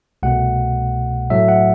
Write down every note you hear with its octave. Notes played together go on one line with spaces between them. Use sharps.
C2 B2 A3 F#5
A2 F#3 A3 E5
F#5